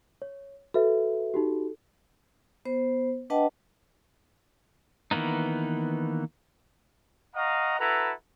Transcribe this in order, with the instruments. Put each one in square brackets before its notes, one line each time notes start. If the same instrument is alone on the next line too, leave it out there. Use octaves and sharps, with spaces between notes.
[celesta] C#5
[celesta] F#4 B4 E5 [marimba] A4
[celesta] D#4 F#4 G4
[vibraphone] B3 C5
D4 B4 D#5 F#5 G5 A5
[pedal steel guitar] D#3 E3 A#3 B3 D#4
[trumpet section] D#5 F5 F#5 A#5 C#6 D#6
E4 F#4 A4 B4 F#5 A#5